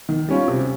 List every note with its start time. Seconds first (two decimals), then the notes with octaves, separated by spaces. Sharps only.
0.09 D#3
0.29 G3 C#4 F4
0.48 C3